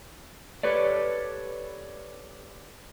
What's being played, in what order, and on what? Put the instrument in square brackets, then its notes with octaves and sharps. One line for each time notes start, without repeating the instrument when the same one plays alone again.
[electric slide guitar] G4 A4 B4 C#5 D5